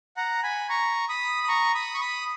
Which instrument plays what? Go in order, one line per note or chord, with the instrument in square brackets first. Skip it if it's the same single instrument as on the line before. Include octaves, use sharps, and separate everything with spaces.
[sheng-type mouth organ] F#5 A#5
G#5 B5
A#5 C#6
B5 D#6
D#6
A#5 C#6
B5 D#6
C#6
B5 D#6